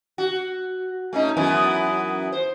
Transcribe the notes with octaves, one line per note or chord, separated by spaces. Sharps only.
F#4
A3 C#4 D#4
F#2 E3 B3
C5